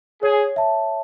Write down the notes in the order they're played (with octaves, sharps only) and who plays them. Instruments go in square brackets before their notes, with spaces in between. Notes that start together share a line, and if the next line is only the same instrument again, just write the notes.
[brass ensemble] G#4 [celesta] C#5
[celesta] E5 A5